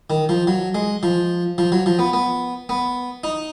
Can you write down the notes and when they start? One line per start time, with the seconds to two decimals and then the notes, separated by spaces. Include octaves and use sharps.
0.10 D#3
0.29 F3
0.47 F#3
0.75 G#3
1.03 F3
1.58 F3
1.72 F#3
1.86 F3
1.99 B3
2.13 B3
2.69 B3
3.24 D#4